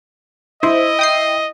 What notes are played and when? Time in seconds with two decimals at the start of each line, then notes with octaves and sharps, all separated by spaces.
0.63 E4 C5 D#5
0.99 G5 D#6 C7